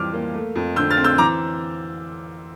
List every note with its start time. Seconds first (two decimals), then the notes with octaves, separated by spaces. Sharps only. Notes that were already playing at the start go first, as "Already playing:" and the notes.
Already playing: F2 E3 G3 D6 F6
0.14 A#3
0.34 A3
0.56 F2
0.76 D3 E6 G6
0.90 F6 A6
0.97 C4
1.04 E6 G6
1.18 E3 A#5 D6